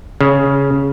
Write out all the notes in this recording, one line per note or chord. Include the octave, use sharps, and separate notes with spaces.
C#3